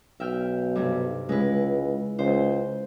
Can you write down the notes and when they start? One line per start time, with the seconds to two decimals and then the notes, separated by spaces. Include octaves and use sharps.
0.20 B1 E5 G5 F6
0.75 G2 C3 G3
1.29 C#2 G#3 E4 B4
2.19 C#2 C5